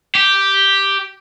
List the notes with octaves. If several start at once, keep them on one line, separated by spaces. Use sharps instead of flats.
G4